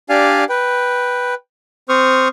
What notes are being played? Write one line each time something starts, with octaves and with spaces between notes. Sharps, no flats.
D4 G4 D5 F5 G#5
B4 G5
C4 C5 C#6 D#6 F6